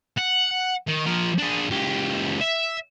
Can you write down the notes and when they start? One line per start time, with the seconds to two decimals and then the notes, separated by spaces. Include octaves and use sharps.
0.17 F#5
0.88 D#3
1.06 F3 A#4
1.38 D4 G#4
1.70 C#2 G4
2.41 E5